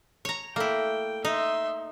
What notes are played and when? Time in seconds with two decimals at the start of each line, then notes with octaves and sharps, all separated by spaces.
0.25 C#5 A#5
0.56 A3 A#3 E4 G5
1.25 D#4 E5 C6